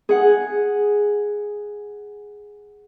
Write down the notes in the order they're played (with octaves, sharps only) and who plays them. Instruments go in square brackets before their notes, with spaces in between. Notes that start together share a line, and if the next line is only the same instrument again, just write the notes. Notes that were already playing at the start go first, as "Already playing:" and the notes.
[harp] G#4 F#5